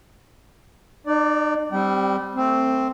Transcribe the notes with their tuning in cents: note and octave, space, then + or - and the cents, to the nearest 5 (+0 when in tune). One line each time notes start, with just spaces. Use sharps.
D#4 -45 D5 +0
G3 +0 C4 +0 G5 -35
A3 +25 C4 +0